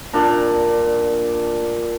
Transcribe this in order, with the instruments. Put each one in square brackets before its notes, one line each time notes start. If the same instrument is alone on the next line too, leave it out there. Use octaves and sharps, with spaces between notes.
[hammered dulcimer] A#2 D4 A#5